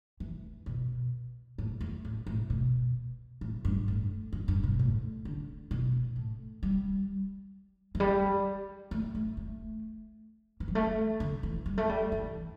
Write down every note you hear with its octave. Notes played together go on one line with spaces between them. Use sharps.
E3
B2
A2
E2
A2
A2
B2
A2
G2
A2
G2
G2
B2
A2
D3
B2
A2
G3
E3
G3
A3
A3
A3
E3
G3
A3
D3
E3
G3
A3
G3
E3